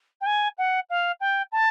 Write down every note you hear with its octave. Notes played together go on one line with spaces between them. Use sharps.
G5
G#5
F#5
F5
G5
A5